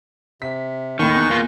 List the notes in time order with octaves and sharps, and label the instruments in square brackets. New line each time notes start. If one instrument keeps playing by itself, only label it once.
[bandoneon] C3 [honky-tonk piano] B6
[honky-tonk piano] D#2 A2 [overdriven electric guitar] D#3 [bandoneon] C#6
[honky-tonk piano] E2 F#6
[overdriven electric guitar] A#3 F4